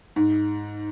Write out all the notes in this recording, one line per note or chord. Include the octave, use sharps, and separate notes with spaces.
G#2